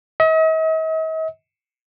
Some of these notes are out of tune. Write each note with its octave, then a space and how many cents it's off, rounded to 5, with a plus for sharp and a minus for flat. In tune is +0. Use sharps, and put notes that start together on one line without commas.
D#5 +45